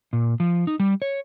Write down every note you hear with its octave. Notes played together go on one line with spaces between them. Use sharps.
A#2
F3
D#4
G3
C#5